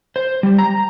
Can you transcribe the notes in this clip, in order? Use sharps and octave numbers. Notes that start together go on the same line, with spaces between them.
C5
G3
A#5